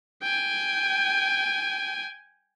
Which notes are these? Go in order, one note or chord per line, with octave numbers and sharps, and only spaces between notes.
G5 G#5